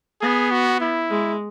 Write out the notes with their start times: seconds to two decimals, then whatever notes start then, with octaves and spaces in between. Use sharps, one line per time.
0.21 B3 G#4
0.51 F#4
0.81 E4
1.10 G#3